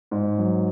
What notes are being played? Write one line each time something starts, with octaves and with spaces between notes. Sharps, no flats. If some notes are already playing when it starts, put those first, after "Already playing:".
G#2
F#3